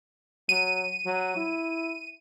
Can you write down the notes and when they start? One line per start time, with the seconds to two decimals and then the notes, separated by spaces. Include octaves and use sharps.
0.49 F#3 D#7
1.05 F#3
1.36 E4